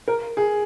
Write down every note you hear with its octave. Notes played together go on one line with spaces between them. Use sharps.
A#4
G#4